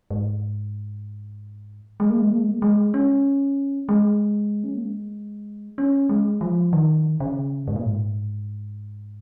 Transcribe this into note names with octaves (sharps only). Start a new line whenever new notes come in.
G#2
G#3
A#3
G#3
A#3
G#3
A#3
G#3
C#4
G#3
C#4
A#3
G#3
C#4
G#3
F3
D#3
C#3
G#2
A#2
G#2